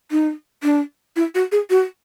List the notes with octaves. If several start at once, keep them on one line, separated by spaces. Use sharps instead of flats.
D#4
D4
E4
F#4
G#4
F#4